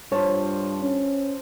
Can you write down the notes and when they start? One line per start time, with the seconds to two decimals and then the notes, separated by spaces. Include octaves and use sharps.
0.12 G2 F3 C#5 A5
0.81 C#4